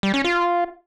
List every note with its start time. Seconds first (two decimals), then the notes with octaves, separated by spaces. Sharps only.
0.03 G3
0.14 C#4
0.24 F4